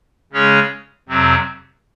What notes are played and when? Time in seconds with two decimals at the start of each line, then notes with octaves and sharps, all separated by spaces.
0.33 C#3 G#3 C#4 G#4 C#5
1.09 F2 C3 F#3 C4